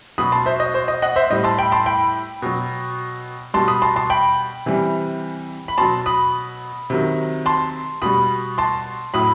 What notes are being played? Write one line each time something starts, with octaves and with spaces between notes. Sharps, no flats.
B2 F#3 B5 D#6
A5 C6
C5 E5
D#5
C5
D#5
D#5 F#5
C5 E5
A2 G3 D#5
A5 C6
G5 B5
A5 C6
G5 B5
B2 F#3
B2 G3 A5 C6
B5 D#6
A5 C6
A5 C6
G5 B5
C3 E3 G3
B5
B2 F#3 A5 C6
B5 D#6
C3 D#3 F#3
A5 C6
B2 G3 B5 D#6
A5 C6
A2 F#3 B5 D#6